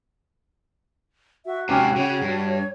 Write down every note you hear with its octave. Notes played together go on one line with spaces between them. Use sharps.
F#4 E5
G#2 C3 C#4 G5 D6 F6
C#3 C#5
G2